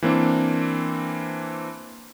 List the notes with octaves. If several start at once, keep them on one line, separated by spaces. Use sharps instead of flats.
E3 A#3 C4 D4